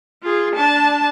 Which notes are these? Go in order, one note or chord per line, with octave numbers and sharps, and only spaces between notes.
F4 G#4
D4 A5